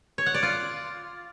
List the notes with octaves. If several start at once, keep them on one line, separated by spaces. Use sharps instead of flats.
C#5
F#5
D5
F4